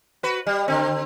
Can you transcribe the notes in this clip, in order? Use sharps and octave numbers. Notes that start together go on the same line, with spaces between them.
F#4 B4
G3
D3 C4